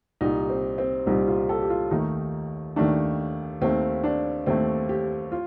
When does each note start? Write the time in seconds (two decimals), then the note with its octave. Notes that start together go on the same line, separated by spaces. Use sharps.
0.21 C2 A#2 G3 D#4
0.49 C4
0.78 C4
1.06 C2 A#2 G3 D#4
1.27 F4
1.49 A4
1.62 G4
1.70 F4
1.91 D#2 D#3 A3 D#4
2.76 D#2 D#3 A3 D4
3.61 D#2 D#3 A3 C4
4.04 D4
4.46 D#2 D#3 A3 C4
4.89 G4
5.32 F4